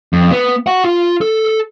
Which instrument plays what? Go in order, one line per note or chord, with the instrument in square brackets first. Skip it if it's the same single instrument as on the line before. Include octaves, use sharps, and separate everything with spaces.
[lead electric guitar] F2
B3
F#4 F#5
F4
A4